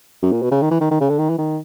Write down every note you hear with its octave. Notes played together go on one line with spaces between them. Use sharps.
F#2
A#2
B2
C#3
D#3
E3
D#3
D#3
C#3
D3
D#3
E3
D#3